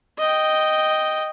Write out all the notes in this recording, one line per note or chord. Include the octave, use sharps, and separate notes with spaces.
D#5 G5